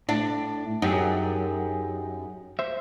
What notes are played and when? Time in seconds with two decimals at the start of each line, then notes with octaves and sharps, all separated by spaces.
0.09 A2 D4
0.82 F#2 D#4 G4 G#4
2.59 C5 E5